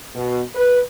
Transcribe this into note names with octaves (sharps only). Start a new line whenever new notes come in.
B2
B4